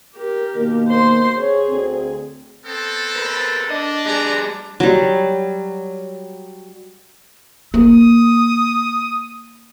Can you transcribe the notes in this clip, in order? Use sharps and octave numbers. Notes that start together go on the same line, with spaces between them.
G4 A#4
B2 D#3 A#3
C5 C6
C3 G#4 C#5
D2 C4
B3 C4 A4
A#4 B4
D4 D#5
G3 G#4 B4 D5 A#5
F#3 G3
A#3 D#6